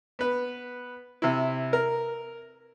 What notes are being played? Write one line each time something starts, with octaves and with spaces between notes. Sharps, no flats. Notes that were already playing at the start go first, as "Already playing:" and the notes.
B3 B4
C3 E4
A#4